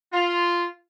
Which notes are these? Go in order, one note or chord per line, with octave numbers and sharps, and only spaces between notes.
F4